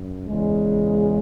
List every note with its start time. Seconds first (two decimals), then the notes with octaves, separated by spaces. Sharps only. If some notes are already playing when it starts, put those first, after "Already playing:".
Already playing: F#2
0.28 E2 C#3 G#3